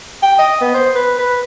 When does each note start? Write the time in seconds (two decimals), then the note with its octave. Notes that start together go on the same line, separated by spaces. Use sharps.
0.23 G5
0.39 D#5
0.61 B3
0.74 C5
0.96 B4
1.19 B4